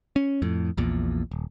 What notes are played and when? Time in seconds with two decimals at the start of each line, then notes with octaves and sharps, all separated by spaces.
0.16 C#4
0.42 F2 A2
0.77 A#1 E2 A#2
1.31 D#1